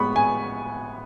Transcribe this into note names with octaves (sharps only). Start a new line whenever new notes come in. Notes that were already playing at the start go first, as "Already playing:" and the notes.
Already playing: A2 G#3 B3 B5 C#6
G#5